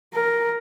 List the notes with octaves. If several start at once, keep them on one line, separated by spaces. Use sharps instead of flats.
A#4